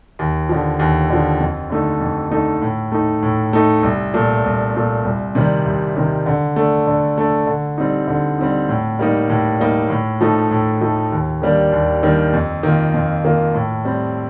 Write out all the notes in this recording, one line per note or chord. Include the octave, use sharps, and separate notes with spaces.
D#2
D3 F3
D#2
D3 F3
F2
D3 A3 D#4
F2
D3 A3 D#4
A2
A3 D#4
A2
A3 D#4
C2
A#2 A3
C2
A#2 A3
C2
C3 D#3 G3
C2
C3 D#3 G3
D3
A3 D4
D3
A3 D4
D3
G3 C4 D#4
D3
G3 C4 D#4
A2
G3 A#3 D#4
A2
G3 A#3 D#4
A2
F3 A3 D#4
A2
F3 A3 D#4
D#2
D#3 G3 A#3 D4
D#2
D#3 G3 A#3 D4
F2
D#3 A#3 F4
F2
D#3 A#3 F4
A2
G3 C4